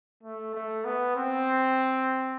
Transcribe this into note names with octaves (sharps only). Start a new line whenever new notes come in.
A3
A3
B3
C4